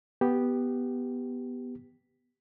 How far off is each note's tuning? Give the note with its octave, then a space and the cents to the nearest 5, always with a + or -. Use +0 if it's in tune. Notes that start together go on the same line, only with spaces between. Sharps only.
B3 +0 G4 +0